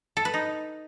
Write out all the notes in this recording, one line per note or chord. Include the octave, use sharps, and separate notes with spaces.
A4
B4
D#4